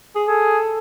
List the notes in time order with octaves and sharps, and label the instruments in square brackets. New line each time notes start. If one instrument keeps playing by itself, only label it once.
[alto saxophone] G#4
[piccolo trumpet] G#4 [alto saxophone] A4